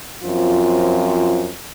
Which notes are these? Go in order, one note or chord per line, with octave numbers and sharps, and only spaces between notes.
F#2 F3 C4 F4